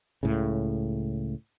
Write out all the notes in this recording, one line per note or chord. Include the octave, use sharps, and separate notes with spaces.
C#2 A2 C#3